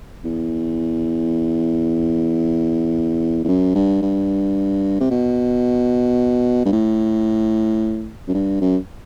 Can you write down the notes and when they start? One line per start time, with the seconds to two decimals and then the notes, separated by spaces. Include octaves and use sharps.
0.25 E2
3.45 E2
3.48 F#2
3.75 G2
4.02 G2
5.00 C3
5.11 B2
6.65 G2
6.73 A2
8.28 F#2
8.34 G2
8.61 F#2